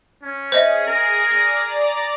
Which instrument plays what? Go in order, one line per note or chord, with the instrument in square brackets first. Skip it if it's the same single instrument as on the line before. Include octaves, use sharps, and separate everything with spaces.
[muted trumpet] C#4
[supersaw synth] G#4 [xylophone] C5 D#5 E5
[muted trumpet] A#4
[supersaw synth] D5 A#5 [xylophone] A#6